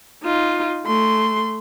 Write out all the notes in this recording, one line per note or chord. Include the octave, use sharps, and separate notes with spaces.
D#4 F4
A3 C6